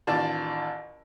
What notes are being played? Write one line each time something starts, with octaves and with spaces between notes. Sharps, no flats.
A1 D#2 F4 D5 A5